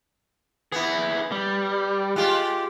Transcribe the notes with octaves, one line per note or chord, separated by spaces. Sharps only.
B3 E4 G#4
G3
G#3 F4 G4